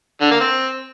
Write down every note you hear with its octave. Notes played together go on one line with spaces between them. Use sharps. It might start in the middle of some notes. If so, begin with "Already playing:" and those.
D3
A#3
C4